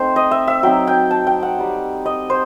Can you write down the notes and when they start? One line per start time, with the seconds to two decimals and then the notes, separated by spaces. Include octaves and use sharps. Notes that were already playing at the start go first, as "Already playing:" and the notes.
Already playing: A3 C4 D#4 C5
0.16 D#5
0.31 E5
0.47 E5
0.63 F#3 C4 D#4 G5
0.87 G5
1.11 A5
1.27 G5
1.43 F#5
1.58 G3 D#4
2.06 D#5
2.30 C5